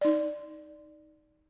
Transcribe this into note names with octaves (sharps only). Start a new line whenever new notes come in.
D#4 D5